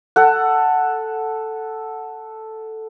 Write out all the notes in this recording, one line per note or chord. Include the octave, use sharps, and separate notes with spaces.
A4 F#5